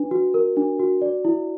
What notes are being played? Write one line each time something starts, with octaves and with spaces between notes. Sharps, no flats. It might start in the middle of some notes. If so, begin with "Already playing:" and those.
Already playing: D4 B4
F#4
A#4
D4
F#4
D5
E4